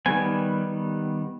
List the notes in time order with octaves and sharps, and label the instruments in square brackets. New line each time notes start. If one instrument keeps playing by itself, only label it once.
[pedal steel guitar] D#3 G3 B3 G#5